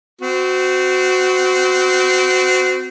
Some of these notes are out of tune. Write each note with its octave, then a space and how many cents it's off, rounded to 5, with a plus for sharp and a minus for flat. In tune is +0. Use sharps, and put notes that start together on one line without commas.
C4 -25 F#4 +0